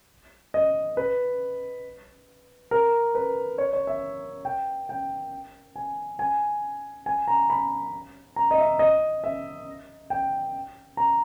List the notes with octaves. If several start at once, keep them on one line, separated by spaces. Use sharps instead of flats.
D#5
B4
A#4
B4
C#5
C#5
E5
G5
G5
G#5
G#5
G#5
A#5
B5
A#5
D#5
E5
D#5
E5
G5
A#5